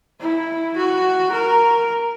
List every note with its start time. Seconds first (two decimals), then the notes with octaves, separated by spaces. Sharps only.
0.21 E4
0.76 F#4
1.32 A#4